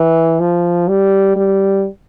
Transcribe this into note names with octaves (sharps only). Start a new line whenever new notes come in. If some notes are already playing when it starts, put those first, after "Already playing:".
Already playing: E3
F3
G3
G3